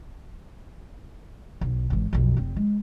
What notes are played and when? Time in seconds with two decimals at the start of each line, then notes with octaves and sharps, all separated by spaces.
1.61 B1
1.90 G#1 E3
2.13 B1 F2
2.37 F1 C4
2.57 G#3